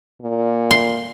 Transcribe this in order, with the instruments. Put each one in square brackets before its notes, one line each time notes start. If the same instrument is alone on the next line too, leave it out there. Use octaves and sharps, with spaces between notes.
[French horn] A#2
[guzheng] C6